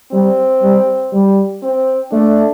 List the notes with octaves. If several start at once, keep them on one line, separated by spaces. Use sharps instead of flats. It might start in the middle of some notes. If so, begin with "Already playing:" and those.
G3 C4
G3
G3
C4
A3 D4